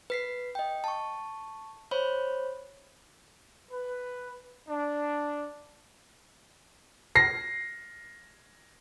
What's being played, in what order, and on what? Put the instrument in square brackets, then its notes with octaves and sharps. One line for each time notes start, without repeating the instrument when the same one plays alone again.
[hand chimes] B4 B6 C7
D#5 G5
A5 C#6
C5 C#5 B5
[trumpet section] B4
D4
[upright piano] A#6 C7